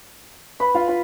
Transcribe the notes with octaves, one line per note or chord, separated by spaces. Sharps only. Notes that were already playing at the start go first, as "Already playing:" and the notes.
B4 B5
F4 F5
F4